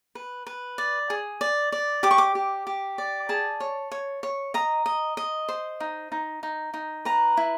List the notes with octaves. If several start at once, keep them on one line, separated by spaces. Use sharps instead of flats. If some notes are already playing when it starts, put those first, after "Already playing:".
B4
B4
D5
G#4
D5
D5
G4 D6
C#6
D6
G4
G4
D5
G#4 A5
C#5
C#5
C#5
D#5 A#5
D#5
D#5
C5
D#4
D#4
D#4
D#4
B4 A#5
E4